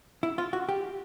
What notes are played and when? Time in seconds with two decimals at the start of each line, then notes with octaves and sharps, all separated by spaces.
0.23 E4
0.38 F4
0.53 F#4
0.69 G4